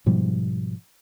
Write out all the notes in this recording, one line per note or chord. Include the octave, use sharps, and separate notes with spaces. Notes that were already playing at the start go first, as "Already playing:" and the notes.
G#2 B2 F3 G3